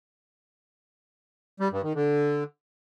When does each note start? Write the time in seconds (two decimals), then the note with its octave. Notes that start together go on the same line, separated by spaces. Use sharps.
1.60 G3
1.72 G2
1.83 D#3
1.95 D3